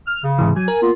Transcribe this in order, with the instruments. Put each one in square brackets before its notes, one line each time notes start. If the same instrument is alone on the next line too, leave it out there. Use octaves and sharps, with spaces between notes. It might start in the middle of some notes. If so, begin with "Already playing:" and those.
[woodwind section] F6
C#3
[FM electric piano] G#2 C3 E3
[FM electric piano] F#3 [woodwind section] G#5
[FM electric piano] A#4
[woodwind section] A#3 B3 F4